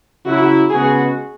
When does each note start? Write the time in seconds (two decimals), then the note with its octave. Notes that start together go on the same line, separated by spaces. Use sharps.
0.25 C#3 F#3 E4 F#4
0.70 C#3 G#3 B3 F#4 G#4